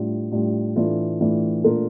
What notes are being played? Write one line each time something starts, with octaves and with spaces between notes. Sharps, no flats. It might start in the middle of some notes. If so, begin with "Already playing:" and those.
Already playing: A2 G3 D4 F4
A2 G3 D4 F4
A2 E3 A3 D4 F4
A2 E3 A3 D4 F4
A#2 A3 D4 F4 A#4